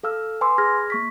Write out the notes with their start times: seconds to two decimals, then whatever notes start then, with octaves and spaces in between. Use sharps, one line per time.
0.03 A4 F5 E6 F6
0.41 B4 G#5 B5 C6 D6 E6
0.58 G#4 F6 G#6 A#6
0.90 A#3 C#6 B6